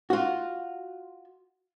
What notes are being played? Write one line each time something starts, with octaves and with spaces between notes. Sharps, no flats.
F4 F#4